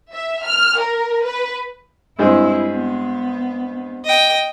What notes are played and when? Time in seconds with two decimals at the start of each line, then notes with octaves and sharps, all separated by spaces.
0.13 E5
0.44 F6
0.80 A#4
1.25 B4
2.19 G2 G#3 C4 E4
2.70 B3
4.04 D#5 G5